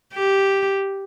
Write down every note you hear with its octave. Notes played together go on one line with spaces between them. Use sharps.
G4